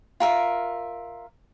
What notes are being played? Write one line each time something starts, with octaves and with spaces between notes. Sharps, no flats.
F4 A#4 E5